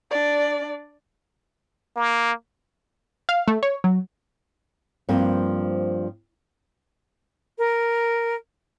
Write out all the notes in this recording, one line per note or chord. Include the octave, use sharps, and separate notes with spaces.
D4 D5
A#3
F5
A3
C#5
F#3
G2 F3 A#3 C4
A#4